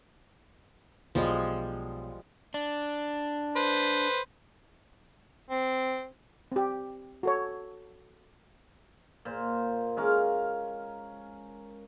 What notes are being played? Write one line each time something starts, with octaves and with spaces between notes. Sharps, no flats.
B1 F3 G3 G#3
D4
B4 C5
C4
C4 G4
F#4 A4 C#5
A#2 C5
G#3 C#4 A#4 F5